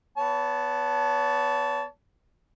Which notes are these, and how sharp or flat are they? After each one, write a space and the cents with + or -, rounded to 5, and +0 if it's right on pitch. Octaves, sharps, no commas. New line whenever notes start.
B3 +0 C#5 +40 A5 +0